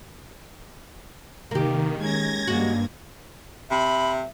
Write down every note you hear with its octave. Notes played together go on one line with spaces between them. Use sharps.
C3 D#3 A#3 G4
G#3 C#4 G#6 A#6
G2 G#3 A#3 F#4
C3 E5 B5